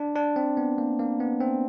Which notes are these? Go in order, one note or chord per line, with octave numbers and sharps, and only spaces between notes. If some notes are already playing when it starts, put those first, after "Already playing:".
Already playing: D4
D4
C4
B3
A#3
A#3
B3
C4